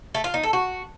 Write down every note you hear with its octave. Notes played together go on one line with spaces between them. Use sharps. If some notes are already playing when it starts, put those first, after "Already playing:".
A3
F4
D#4
A4
F#4